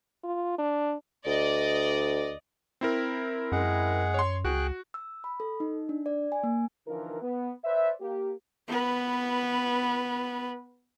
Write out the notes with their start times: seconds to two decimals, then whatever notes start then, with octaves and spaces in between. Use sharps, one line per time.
0.24 F4
0.58 D4
1.26 D2 D5 D#5
2.81 C4 E4 A#4
3.52 F#2 G#3 G#4 F#5
4.14 C#5 C6
4.45 C#2 F#4 G#4 G5 F#6
4.94 E6
5.24 B5
5.40 A4
5.60 D#4
5.89 D4
6.06 D5
6.32 G#5
6.43 A#3
6.87 D3 E3 F3 D#4 A#4
7.22 B3
7.64 B4 C5 D5 E5
8.01 A#3 G4
8.68 B3 B4